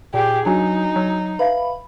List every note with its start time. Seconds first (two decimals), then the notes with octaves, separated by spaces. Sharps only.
0.14 A#2 G4 G#4
0.46 F#3 D4 D#4 F#4 G#5
0.96 F#3
1.39 B4 E5 F5 B5